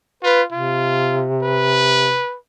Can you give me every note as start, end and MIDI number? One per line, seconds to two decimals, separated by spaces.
0.23 0.46 65
0.23 0.42 71
0.52 2.20 48
0.52 1.26 65
1.42 2.37 71